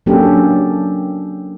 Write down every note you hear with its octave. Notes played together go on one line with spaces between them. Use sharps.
F#3 A#3 C#4 D4 G4 A4